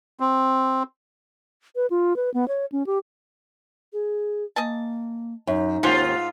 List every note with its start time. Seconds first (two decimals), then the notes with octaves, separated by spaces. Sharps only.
0.20 C4
1.76 B4
1.90 F4
2.16 B4
2.34 B3
2.48 C#5
2.72 C#4
2.87 G4
3.93 G#4
4.56 A#3 D#5 G#5 A5
5.47 F#2 D#4
5.83 D#2 G#2 G3 C#4 F4 C5 F#5